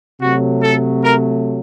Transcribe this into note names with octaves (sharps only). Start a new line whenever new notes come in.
C3 F#3 A3 F#4
A4
A#4